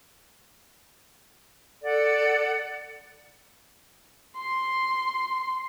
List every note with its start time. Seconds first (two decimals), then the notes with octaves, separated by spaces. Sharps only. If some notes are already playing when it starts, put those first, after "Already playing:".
1.83 A4 D5 F#5
4.38 C6